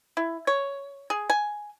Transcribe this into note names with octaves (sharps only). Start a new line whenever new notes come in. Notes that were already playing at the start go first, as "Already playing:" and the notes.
E4
C#5
G#4
G#5